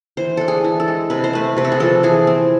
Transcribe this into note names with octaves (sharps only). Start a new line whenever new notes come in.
E3 C5
D4 A4
G#4
E3
A4
G#3
C3 B4
C5
A3 B4
C3 B4
A4
G#4
F3 A4
E3 G#4
C4